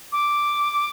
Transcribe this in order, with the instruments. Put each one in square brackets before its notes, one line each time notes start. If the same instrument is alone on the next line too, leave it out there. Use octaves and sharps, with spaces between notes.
[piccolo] D6